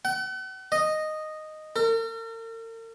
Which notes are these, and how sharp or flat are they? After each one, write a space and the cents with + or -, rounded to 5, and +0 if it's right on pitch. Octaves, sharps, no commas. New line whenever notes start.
F#5 +40
D#5 -5
A#4 -45